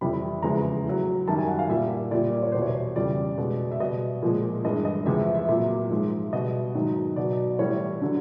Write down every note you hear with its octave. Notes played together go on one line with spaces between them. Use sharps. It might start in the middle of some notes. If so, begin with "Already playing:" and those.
F2 C3 E3 G3 B5
E2 C#3 F3 G#3 A#5
A2 F#3
F#2 D#3 G3 A5
G#5
F#5
F5
A#2 G3 E5
A#2 G3 D5
D5
C#5
E2 B2 G3 C5
C#5
F2 C#3 E3 G3 D5
B2 G#3
E5
B2 G3 D#5
A#2 F3 G#3
G2 E3 G#3 D#5
D#5
E2 C3 F3 G#3 E5
E5
E5
A#2 F#3 E5
G#2 F3 G#3
B2 G3 D#5
G#2 D#3 F#3
B2 F#3 D5
A2 E3 G3 C#5
D3 F#3